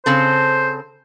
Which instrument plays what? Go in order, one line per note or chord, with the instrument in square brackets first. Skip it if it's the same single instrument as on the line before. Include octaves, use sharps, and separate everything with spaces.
[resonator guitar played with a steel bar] C#3 C4 A4 [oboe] C5